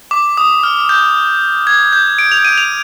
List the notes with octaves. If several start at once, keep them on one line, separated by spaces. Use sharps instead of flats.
D6
D#6
F6
G6
G#6
G6
D7
F7
D#7
F7